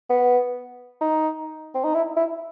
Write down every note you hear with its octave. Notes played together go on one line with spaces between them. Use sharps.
B3
D#4
C4
D#4
E4
E4